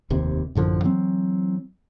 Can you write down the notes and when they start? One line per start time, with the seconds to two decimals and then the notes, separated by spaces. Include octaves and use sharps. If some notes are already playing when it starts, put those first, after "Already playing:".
0.10 F1 D#2 C3
0.55 A1 F#2 D3 F3
0.84 E3 F#3 C4